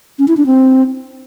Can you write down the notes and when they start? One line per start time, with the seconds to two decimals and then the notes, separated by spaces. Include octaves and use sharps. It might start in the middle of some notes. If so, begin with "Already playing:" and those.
0.19 C#4
0.28 E4
0.37 D4
0.46 C4